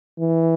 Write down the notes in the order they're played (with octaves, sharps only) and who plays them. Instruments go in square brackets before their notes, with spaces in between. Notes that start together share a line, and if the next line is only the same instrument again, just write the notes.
[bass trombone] E3